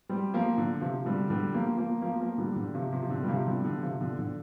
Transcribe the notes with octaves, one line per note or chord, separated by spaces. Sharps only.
G3 C4
F3 A#3
D3
C3 F3
D3 G3
D3 G3
F3 A#3
F3 A#3
F3 A#3
F3 A#3
D3 G3
D3
C3 F3
C3
F3
D3
G3
C3 F3
D3 G3
D3
C3 F3
D3
D3